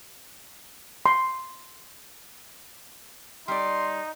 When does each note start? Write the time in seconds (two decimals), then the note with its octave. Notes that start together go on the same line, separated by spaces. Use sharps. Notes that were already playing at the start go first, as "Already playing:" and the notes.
1.06 C6
3.48 G3 D#4 D5 C6